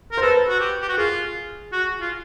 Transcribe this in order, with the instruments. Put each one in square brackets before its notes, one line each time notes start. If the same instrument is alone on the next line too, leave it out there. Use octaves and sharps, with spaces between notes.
[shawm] A#4
[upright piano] C5
[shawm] A4 [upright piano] B4
[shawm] F#4
G4
G4
F#4
[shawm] F4 [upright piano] G#4
[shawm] F#4
F4